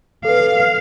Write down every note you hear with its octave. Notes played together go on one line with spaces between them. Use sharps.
A4 B4 F5